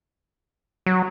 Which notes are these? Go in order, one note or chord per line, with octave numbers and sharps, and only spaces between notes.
F#3